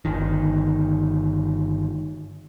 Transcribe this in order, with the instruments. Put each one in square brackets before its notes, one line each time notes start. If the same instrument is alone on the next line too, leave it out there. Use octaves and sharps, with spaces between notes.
[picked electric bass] G1 D#3